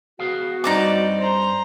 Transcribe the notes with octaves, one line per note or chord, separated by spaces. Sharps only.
B3 F#4 G#4 F5
G2 G3 C4 D#4 D5 A5 D6
C5 A#5